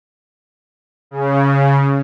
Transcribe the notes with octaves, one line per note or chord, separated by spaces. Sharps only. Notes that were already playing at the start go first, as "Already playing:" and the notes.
C#3